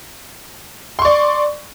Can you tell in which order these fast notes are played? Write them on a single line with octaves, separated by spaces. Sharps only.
C6 C#6 D5